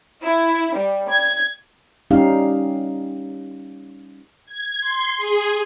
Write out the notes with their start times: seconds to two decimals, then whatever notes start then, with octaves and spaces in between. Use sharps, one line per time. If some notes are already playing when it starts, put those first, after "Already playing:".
0.23 E4
0.75 G3
1.09 G#6
2.11 G3 C#4 D#4 G4 F5
4.46 G#6
4.80 C6
5.17 G#4